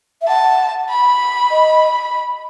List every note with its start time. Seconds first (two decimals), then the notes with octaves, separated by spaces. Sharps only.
0.21 E5
0.28 F#5 A5
0.90 B5
1.50 D#5